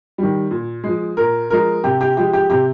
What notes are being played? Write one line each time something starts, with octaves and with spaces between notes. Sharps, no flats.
D#3 G3
A#2
F3 G#3
A#2 A#4
F3 G#3 A#4
C3 G4
G4
F3 G#3 G4
G4
C3 G4